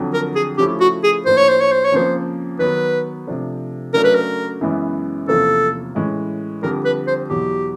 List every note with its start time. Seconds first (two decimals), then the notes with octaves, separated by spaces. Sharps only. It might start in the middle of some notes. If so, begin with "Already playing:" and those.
Already playing: F2 D3 F#3
0.14 A#4
0.36 G#4
0.58 C#3 F3 A3 C#4 E4 G4
0.81 F#4
1.04 G#4
1.26 A2 F3 A#3 D4 C5
1.37 C#5
1.49 C5
1.61 C#5
1.72 C5
1.85 C#5
1.92 F2 C#3 F3 A#3 C5
2.59 D#3 F#3 B3 B4
3.27 C3 F3 A3 D4
3.94 C#3 F#3 A3 D4 A#4
4.04 B4
4.15 A#4
4.61 F#2 C#3 E3 G#3 B3
5.28 E2 C3 F3 A#3 C#4 A4
5.95 A2 E3 G#3 C#4
6.63 F2 D3 G3 A#4
6.85 B4
7.07 C5
7.30 E2 B2 F#3 G4